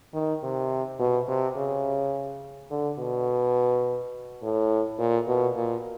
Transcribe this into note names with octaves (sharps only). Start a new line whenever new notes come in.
D#3
C3
B2
C3
C#3
D3
B2
A2
A#2
B2
A#2